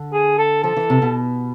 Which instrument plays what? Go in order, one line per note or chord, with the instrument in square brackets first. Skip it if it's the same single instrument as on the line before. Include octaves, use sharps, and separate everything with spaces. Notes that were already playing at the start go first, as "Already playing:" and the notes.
Already playing: [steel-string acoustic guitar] D3
[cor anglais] G#4
A4
[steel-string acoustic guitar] F3 [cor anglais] A4
[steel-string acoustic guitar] E3
C3
B2